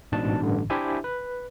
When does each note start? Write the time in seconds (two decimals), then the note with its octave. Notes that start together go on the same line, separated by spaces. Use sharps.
0.12 A1 G#2 B2 D4 A5
0.42 A1 G2 D3
0.70 D4 E4 G4 C5 E5 G#5
1.04 B4